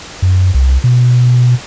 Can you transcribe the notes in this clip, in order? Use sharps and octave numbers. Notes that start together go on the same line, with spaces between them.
F#2
C2
B2